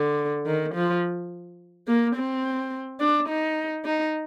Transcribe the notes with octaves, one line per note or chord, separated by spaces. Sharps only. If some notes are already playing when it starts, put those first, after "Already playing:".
Already playing: D3
D#3
F3
A#3
C4
D4
D#4
D#4